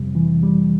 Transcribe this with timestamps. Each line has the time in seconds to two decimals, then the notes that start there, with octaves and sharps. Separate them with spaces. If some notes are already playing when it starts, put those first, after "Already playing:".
Already playing: F2 C3 G3
0.15 E3
0.43 G3